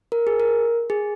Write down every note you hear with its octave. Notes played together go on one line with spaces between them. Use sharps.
A#4
G#4
A#4
G#4